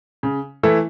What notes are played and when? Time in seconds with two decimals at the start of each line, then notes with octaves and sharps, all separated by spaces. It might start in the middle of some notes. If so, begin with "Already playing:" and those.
0.23 C#3
0.63 E3 A3 E4 A4